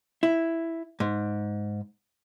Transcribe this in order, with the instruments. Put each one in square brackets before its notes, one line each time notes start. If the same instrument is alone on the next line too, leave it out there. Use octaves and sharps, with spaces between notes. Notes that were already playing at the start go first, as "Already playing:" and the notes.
[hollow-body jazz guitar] E4
G#2